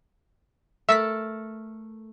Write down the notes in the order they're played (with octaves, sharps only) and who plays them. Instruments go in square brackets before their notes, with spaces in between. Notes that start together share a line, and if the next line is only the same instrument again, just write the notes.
[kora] A3 A4 A#4 [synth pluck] E5 E6 B6